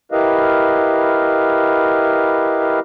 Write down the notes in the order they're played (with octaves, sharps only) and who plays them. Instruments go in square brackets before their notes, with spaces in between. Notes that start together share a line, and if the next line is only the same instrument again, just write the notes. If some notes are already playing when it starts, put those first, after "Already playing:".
[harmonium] E4 G4 A#4 B4 D#5 F5